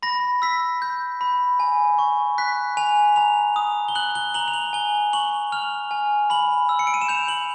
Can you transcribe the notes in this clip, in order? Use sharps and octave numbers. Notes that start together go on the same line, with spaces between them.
B5 A#6
E6 B6
G6
B5
G#5
C#6
F#6 B6
G#5 F7
A#5 F7
D#6
G7
F#6 F#7
G7
A#5 F#7
F7
F#7
G#5 G7
C#6 F#7
F6 F7
G#5
B5 F#7
E6
C#7
D7
D#7
E7
G6 F7
F#7